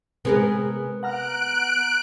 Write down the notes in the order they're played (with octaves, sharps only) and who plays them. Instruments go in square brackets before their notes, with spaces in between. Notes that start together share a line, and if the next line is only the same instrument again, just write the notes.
[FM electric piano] C3 G#3 C4 [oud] B3 G#4 A#4
[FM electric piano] F#5 A#5 F6 [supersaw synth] F#6 D7